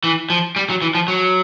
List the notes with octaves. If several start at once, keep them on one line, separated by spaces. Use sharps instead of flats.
E3
F3
G3
F#3
E3
F3
F#3